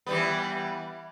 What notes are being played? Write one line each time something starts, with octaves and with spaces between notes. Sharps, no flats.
E3 G3 B3